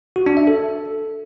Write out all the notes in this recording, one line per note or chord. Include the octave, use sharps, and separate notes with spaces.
F#4
D4
E5
A4